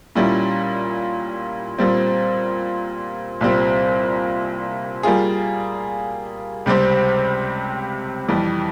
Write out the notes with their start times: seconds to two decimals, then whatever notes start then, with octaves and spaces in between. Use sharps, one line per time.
0.15 A#2 G3 C#4 E4
1.79 A#2 G3 C4
3.41 C2 A#2 G3 C4
5.03 G3 A#3 F4 G#4
6.66 C#2 C3 G3 C4 G4
8.28 F2 E3 G3